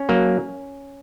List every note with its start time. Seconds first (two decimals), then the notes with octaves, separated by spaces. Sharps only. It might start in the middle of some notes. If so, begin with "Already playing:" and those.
Already playing: C#4
0.09 F#3 A#3